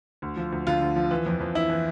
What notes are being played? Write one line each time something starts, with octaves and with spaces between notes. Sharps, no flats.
D2
F3
D2
D3 F4
D2
F3
E3
F2
F2
E3 E4
E3